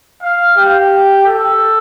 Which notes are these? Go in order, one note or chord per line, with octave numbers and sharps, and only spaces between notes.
F5
G4
A4